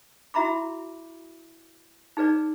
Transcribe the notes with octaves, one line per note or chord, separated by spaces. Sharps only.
E4 F#4 E5 A#5 B5 D6
D#4 G#4 B4 D5